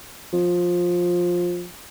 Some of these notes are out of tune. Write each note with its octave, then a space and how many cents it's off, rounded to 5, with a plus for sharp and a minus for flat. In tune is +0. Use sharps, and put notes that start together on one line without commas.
F3 +15